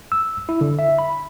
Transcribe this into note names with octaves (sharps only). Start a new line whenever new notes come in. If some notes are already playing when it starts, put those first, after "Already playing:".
E6
E4
D3
E5
B5